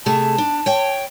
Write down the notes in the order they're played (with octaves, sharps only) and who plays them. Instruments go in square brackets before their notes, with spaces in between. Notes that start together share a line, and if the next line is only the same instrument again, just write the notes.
[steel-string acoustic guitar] C3 A3 G#4 [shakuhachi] A5
[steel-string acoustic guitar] D4
C#5 G5